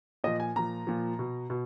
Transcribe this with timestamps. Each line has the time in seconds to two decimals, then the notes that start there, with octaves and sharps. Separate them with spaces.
0.24 A#2 F3 D#5
0.40 G#5
0.56 A#2 F3 A#5
0.87 A#2 F3
1.19 B2
1.50 B2